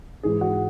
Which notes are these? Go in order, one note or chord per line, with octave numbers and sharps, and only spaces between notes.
G#2 E3 G#3 G#4
F#4